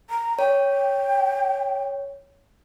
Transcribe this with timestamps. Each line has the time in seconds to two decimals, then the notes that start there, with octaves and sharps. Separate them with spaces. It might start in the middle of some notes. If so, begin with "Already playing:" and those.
0.10 A#5
0.39 C#5 G5